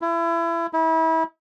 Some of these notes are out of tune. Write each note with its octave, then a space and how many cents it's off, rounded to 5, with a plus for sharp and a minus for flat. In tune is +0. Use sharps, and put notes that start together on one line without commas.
E4 +30
E4 -30